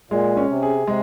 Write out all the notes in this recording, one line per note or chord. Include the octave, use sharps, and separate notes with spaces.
A#2 G#3
C#4
C3
G#4
C3 G#3